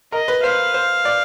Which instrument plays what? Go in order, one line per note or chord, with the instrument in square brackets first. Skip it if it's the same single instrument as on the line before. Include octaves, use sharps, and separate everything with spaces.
[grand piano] A#4 [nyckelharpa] D#5
[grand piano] B4
[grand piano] C5 [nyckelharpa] F5
[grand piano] C5
D5